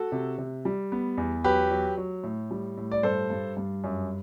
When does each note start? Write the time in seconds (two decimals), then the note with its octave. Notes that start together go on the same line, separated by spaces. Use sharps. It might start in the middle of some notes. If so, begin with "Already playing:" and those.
Already playing: F#4 A4
0.12 C3
0.38 C3
0.65 G3
0.92 B3
1.18 E2
1.44 F#3 G4 B4
1.71 F#3
1.97 F#3
2.24 A2
2.51 G3
2.77 A2
2.92 D5
3.03 G2 A4 C5
3.30 G2
3.57 G2
3.84 F#2